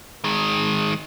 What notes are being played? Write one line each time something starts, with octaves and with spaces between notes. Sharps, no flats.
D#3 G#3